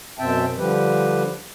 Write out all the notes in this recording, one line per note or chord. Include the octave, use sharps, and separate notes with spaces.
F#2 B2 C4 E5 G5 A5
D3 F3 G3 G4 B4